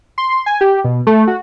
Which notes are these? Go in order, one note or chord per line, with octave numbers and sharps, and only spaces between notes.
C6
G#5
G4
B2
A3
F#4